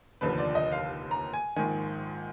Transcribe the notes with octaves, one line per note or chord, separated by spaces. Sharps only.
F1 D#2 D3 F3 B4
D5
D#5
F5
A#5
G#5
A#1 G#2 D#3 G#5